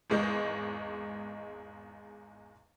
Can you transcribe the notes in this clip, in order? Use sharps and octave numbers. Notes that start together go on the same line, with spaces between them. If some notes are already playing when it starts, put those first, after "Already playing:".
G#1 E2 G#3 D#5 G6